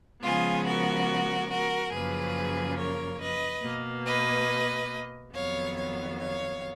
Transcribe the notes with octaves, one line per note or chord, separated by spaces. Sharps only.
C#3 F3 G#3 B3 F4 G#4
F#4 A#4
F#4 A#4
F#2 C#3 F3 A#3 G#4 B4
A#4 C#5
B4 D#5
B2 A#3
B4 D#5
F2 D#3 F#3 B3 C#5 F5
C#5 F5
C#5 F5